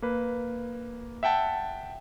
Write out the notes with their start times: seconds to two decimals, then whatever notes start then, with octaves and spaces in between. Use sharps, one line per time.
0.02 A#3 B4
1.23 E5 F#5 G5 A5